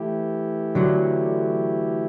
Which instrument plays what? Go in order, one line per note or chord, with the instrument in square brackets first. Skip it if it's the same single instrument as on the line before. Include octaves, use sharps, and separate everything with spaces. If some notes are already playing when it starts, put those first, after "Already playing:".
Already playing: [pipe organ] E3 A3 E4 G4
[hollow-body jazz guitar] D3 F#3